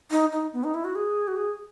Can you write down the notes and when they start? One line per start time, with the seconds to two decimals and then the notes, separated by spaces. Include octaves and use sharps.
0.11 D#4
0.32 D#4
0.53 B3
0.64 D#4
0.74 E4
0.84 F#4
0.95 G#4
1.28 F#4
1.37 G#4